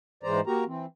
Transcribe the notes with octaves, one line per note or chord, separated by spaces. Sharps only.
G#2 E3 G#3 C5 D5 A#5
A#3 F#4 G4 A#4 A#5
E3 C4